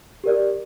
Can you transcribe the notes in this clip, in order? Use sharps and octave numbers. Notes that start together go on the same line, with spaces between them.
G4 A#4 D5